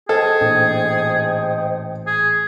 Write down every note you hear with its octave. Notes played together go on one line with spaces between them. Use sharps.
G#4 A4 C5 D#5 G5
A1 A#2 D4
G#4